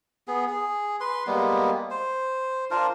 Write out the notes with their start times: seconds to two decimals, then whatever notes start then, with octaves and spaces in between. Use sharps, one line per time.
0.28 B3 G#4
0.47 G#4
1.01 B4 C6
1.27 G3 G#3 A#3 B3
1.90 C5
2.71 D4 F4 A#4 C5